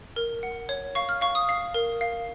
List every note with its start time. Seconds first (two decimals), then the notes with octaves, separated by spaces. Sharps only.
0.16 A#4
0.43 F#5
0.69 C#5
0.95 F5 C#6
1.09 F6
1.21 F5 C#6
1.35 D#6
1.49 F5 C7
1.74 A#4
2.01 F5